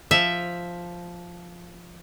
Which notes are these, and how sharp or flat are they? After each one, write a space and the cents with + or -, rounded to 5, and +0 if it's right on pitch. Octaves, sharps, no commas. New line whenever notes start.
F3 +0 E5 +0